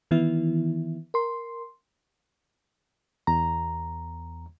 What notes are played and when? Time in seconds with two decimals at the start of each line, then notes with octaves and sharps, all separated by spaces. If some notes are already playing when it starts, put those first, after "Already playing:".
0.11 D#3 E3 B3 E4
1.14 A#4 C6
3.27 E2 A#5